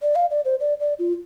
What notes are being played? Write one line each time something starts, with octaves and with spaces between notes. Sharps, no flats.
D5
F5
D5
C5
D5
D5
F4